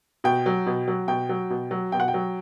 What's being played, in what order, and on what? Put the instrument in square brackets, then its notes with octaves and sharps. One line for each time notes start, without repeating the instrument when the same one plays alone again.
[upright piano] B2 G5
F#3
B2
F#3
B2 G5
F#3
B2
F#3
B2 G5
F#5
G5
F#3